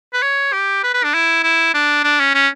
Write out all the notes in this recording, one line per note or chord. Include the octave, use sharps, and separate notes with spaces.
B4
C#5
G4
B4
B4
D4
E4
E4
D4
D4
C#4
C#4